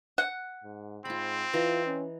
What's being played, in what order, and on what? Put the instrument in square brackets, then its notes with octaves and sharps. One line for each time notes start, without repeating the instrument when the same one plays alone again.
[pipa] F#5
[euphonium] G#2
[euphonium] G#2 [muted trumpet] C4 [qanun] F4 B5
[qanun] E3 D#5 A#5 [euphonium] F4
[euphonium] C#4